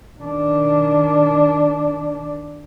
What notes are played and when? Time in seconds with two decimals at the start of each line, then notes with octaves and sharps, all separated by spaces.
0.20 D#3 D4